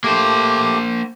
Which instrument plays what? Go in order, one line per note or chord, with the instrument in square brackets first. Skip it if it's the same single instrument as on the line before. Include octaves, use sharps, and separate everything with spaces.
[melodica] A3 G4 [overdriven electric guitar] A#3 C5